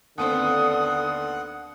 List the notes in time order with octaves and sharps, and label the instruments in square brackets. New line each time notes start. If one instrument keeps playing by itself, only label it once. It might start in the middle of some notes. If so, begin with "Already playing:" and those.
[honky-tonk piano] D#2 B3 C4 [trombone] D3 [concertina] F#5 [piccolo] D#6